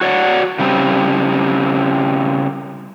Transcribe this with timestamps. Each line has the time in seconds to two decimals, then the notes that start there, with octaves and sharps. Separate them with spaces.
0.01 F#4 C#5 D5 F#5
0.59 C#3 G3 C4